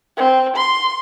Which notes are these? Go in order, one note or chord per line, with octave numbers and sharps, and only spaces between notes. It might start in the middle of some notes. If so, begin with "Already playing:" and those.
C4
C6